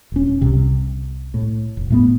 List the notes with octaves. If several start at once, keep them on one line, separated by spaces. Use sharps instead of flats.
D#1 C#4
C2 C3
A2
F1
A2 A3 B3